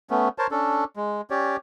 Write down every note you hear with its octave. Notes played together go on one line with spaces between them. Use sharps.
A3 B3 C#4
A#4 C5 C#5 A5
C#4 D4 A4
G#3
C#4 G4 C#5 D5